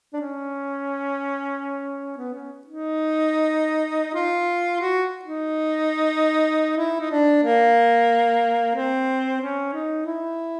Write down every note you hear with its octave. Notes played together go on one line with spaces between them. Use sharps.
D4
C#4
B3
C#4
D#4
F4
F#4
D#4
E4
D#4
D4
A#3
C4
C#4
D#4
E4